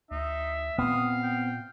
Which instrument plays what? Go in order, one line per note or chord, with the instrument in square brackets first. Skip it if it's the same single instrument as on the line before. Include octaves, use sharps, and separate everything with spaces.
[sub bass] D2 [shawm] D#4 [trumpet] E5
[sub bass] A#2 [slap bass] B3 C4 [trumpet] F5 [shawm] D#6
[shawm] G5